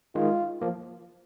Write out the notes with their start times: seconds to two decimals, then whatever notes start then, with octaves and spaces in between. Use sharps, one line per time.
0.15 D#3 G#3 F4
0.61 F3 A#3